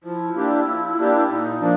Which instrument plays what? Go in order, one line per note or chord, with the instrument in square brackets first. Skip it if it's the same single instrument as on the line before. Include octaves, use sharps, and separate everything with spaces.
[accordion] F3 [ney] E4
[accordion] A#3 D4 G4
F3
A#3 D4 G4
[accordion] A#2 [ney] D#4
[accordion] F3 A#3 D4